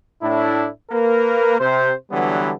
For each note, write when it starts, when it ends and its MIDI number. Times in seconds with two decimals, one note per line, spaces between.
0.22 0.68 45
0.22 0.68 62
0.22 0.68 64
0.91 1.56 58
0.91 1.56 70
0.91 1.56 71
1.59 1.92 48
1.59 1.92 72
2.11 2.51 50
2.11 2.51 52
2.11 2.51 54
2.11 2.51 55
2.11 2.51 59
2.11 2.51 62